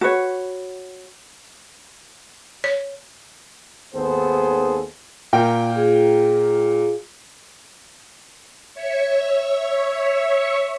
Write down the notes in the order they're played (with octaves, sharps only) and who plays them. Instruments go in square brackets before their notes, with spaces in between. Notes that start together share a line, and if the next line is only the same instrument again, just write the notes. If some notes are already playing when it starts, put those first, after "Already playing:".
[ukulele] F#4 B4 C#5
[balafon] C#5
[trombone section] G#1 D#2 B3 G#4 A4 C5
[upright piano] A#2 A#4 G5
[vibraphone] F4 G#4
[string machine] C#5 E5 C#6